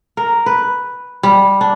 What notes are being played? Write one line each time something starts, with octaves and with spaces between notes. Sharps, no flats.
A#4
B4
G3
D4